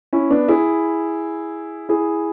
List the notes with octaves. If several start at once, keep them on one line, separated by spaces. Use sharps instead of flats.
C#4 E4
B3 D4
E4 G#4
E4 G#4